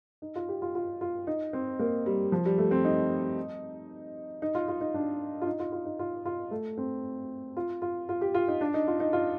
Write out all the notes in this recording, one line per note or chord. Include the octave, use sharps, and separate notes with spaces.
D#4
F4
G4
F4
F4
F4
D#4
C4
A#3
G3
F3
G3
A3
C4
D#4
D#4
F4
F4
D#4
D4
F4
D#4
F4
F4
D#4
F4
F4
A3
C4
F4
F4
F4
G4
F4
D#4
D4
D#4
F4
D#4
F4